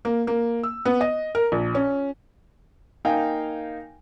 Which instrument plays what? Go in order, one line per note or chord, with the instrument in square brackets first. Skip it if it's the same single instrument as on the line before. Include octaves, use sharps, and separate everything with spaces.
[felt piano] A#3
A#3
E6
B3
D#5
A#4
A#1
C#4
[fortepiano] A#3 D#4 F5 G5 G#5